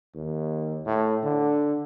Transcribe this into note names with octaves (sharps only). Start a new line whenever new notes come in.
D#2
A2
D3